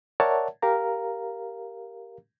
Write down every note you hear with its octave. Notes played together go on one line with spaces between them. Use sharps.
A#4 C#5 D5 E5 F#5 A5
G4 A#4 F5 A#5